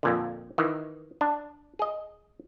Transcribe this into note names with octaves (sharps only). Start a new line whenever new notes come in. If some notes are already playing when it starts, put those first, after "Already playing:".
F2 A#2 D3
D#3 E3
D4
G#4 D#5